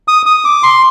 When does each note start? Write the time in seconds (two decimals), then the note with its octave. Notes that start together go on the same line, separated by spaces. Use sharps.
0.08 D#6
0.26 D#6
0.45 D6
0.63 C6